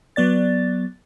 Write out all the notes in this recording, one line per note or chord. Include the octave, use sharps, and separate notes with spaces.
F#3 B3 D5 A6